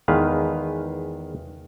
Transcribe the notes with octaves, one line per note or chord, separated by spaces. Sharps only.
E2 D#3 G#3 B4 F5